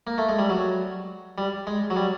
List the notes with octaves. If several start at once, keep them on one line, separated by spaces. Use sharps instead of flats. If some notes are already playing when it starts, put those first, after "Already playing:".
A#3
A3
G#3
G3
F#3
G3
G#3
F#3
G3